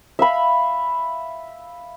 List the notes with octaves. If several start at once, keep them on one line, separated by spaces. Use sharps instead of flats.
E5 F5 B5